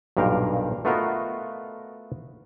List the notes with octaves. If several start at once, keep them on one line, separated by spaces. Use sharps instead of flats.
B1 G2 A#2 A#4 F5 G5
A3 B3 F4 F#4 A#4 D#5